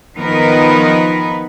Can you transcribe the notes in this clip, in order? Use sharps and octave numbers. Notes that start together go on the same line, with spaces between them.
D#3 F3 B3 D#4 A#4 B4